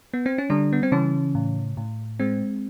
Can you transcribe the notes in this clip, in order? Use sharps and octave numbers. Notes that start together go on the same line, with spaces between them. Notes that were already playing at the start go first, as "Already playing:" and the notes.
B3
C4
C#4
D3 G3 D4
B3
C4
C#3 E3 C#4
A2
A2
G#3 C4